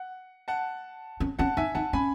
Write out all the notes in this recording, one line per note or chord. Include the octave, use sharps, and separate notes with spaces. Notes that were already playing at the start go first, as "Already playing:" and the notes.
Already playing: F#5
F#5 A5
C#4
C#4 F#5 A5
D#4 E5 G#5
D#4 F#5 A5
C#4 G#5 B5